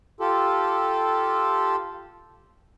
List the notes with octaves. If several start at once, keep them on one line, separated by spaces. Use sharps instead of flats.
F4 G4 A4